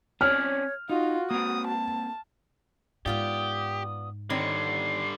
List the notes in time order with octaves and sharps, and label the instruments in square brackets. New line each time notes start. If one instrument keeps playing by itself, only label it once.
[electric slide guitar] C4 C#4 D5 [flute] C#5 [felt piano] F6
[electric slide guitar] D#4 [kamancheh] F4 [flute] F#4
[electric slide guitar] A#3 C4 [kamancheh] D#6
[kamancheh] A5
[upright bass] G#2 [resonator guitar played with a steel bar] B3 F4 D5 [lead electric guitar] G4 [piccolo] D#6
[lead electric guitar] D3 G3 [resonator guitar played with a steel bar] D#3 C4 C#5 [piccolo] C7